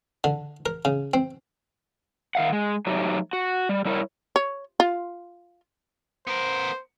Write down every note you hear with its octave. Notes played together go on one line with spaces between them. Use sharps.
D3
A#4
C#3
C4
D#3 F5 F#5
G#3
F#3 A3 D#4 F#4 G4
F#4
G3
G3 E4 A#4 C#5
C#5
F4
B3 A#4 C5